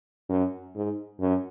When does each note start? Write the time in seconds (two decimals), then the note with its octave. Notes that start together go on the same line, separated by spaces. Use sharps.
0.29 F#2
0.75 G#2
1.20 F#2